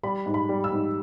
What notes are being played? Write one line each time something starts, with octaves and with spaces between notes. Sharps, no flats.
G3 B5
G#2
B5
G3
E6
G#2